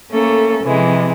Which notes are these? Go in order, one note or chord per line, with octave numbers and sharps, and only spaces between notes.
A3 A#3 C#4 A4
C3 E3 F3 G#3